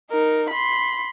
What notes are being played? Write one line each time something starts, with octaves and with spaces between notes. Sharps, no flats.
D#4 A#4
B5 C6